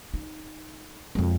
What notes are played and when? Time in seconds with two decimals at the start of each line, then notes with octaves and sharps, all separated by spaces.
0.14 D#4
1.15 F2 G#3